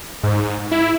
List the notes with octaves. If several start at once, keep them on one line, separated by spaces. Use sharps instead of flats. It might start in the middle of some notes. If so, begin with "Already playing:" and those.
G#2
E4